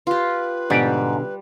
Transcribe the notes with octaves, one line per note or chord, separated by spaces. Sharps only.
F4 G4 B4
G#2 B2 D3 G3 G4 D5